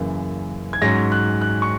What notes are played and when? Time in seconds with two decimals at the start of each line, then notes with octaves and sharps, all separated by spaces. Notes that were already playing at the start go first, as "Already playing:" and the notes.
Already playing: F#2 C#3 E3 A#3
0.73 G#6
0.82 G#2 F#3 C#4 A#6
1.12 F#6
1.41 F#6
1.62 C#6